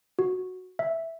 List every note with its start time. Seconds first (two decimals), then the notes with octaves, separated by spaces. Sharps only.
0.19 F#4
0.79 E5